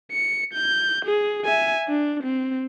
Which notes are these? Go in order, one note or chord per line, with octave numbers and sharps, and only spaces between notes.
C#7
G6
G#4
E5 G#5
D4
C4